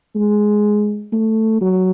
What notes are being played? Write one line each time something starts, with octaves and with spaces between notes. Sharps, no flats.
G#3
A3
F#3